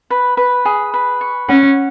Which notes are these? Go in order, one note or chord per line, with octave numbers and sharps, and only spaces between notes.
B4
B4
G#4
B4
C#6
C#4 F#5